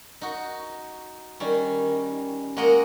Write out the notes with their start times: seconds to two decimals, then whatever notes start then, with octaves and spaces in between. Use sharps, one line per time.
0.21 D#4 F#4
1.40 D#3 G3 C#4
2.57 G#3 A#3 F#4 A#4 D#5 F#5